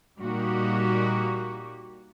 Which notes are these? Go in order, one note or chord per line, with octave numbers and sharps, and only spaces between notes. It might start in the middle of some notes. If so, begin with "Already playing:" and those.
A#2 G3 A#3 D#4 F#4 G4